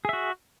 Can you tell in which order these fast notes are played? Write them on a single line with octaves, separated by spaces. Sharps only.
G#4 E5 F#4